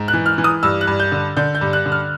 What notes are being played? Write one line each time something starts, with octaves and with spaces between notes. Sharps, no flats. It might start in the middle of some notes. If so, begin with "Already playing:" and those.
Already playing: G#2
F#6
E3
F6
E3
D#6
G2 E6
F#6
G2
G6
D3
D3 G6
G6
G2
F#6
D3
F6